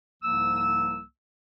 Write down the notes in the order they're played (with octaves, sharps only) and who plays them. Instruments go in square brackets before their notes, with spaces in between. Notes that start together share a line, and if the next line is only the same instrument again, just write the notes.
[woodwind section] C2 G#2 F3 A#3 E6